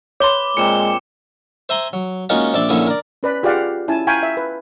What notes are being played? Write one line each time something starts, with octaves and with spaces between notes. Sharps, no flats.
B4 C#5 C6 D6 G7
A#2 G#3 C4 A#5 C#7 E7
C5 E5 G#5 A#5 C6
F#3
G#3 A#3 C#4 D#4 F4 F#4
A#1 C4 D5 E5 D6
A#1 A#2 D3 C#4 E4 G#4
A#4 D5
C#4 B4 D5 B5
F4 G4 G#4 D5 F5 F#5
C#4 E4 G#5 A5
F5 G5 G#5 A#5 B5 C#6
E5
B4